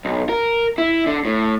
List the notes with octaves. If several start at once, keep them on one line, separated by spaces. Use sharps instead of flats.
B1
A#4
E4
D3
A2